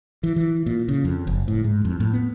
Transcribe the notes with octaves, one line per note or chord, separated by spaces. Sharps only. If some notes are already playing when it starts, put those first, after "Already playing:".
E3
E3
A#2
C#3
F2
F#1
A2
G#2
F2
A2
B3